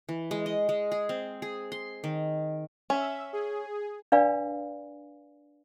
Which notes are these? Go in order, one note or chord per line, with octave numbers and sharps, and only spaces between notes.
E3
G#3
D#5
G#3
G#4
C4
G#4
C6
D#3
C#4 E5
G#4
D4 B4 D5 F5 G#5 B5